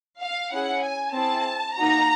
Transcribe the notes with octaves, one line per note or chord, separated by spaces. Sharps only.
F5
C#4 E4 G#4 F#5
G#5
C4 E4 G#4 A5
A#3 D#4 F#4 A#5